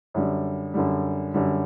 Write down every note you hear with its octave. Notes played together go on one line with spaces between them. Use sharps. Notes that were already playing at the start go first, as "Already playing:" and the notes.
F#2 D3 G3
F#2 D3 G3
F#2 D3 G3